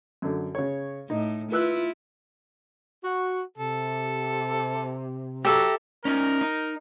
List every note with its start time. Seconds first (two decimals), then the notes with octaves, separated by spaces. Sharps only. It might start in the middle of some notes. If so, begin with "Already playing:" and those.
0.22 F#2 D3
0.55 C#3 C#5
1.10 A2 D#4
1.52 E4 F4 B4 E6 F#6
3.04 F#4
3.58 C3 A4
5.45 F#3 G4 A4 E5 A#5
6.05 C#4 D#4 A#4
6.41 D#4